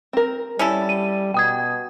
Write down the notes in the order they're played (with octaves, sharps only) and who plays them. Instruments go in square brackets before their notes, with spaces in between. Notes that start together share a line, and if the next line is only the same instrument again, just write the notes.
[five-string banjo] C4 A#4
[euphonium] G3 [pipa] C#4 E4 A4
[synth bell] D#7
[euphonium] B2 [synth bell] G5 D#6 G#6